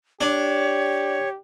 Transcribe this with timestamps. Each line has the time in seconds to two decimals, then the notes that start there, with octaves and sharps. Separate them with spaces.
0.21 D4 G4 C#5